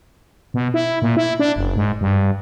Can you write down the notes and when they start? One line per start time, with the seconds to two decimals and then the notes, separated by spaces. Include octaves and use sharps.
0.54 B2
0.74 E4
1.02 A#2
1.17 E4
1.39 D4
1.56 F#1
1.76 G#2
2.01 G2